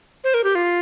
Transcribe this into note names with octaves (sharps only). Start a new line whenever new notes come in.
C5
A#4
G4
F4